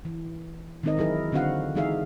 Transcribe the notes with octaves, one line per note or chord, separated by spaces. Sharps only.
E3
D#3 G#3 C4 D#4 A#4 D#5
E3 F#3 E4 G#4 A#4
D3 C4 D4 F#4 F5 F#5
E3 G#3 D#4 G#4 E5 F5